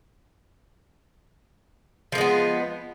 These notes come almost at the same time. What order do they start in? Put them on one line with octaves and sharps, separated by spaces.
F3 A#3 G#3 B3